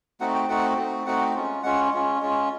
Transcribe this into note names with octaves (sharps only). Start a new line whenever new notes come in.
A3 C4 D#4 F#4 F#5
G5
A3 C4 D#4 F#4 F#5
A3 C4 D#4 F#4
A3 C4 D#4 F#4 F#5
G#3 C#4 F4
G#3 C#4 F4 F#5
G#3 C#4 F4
G#3 C#4 F4